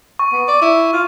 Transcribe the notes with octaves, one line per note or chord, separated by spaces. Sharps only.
C#6
B3
D5
E4
F4